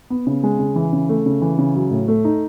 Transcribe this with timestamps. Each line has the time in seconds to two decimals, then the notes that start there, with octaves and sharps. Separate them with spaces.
0.10 B3
0.27 C#3
0.43 G#3
0.59 C#3
0.76 E3
0.93 C#3
1.09 A3
1.26 C#3
1.42 E3
1.58 C#3
1.75 F#3
1.91 A2
2.08 A3
2.25 D#4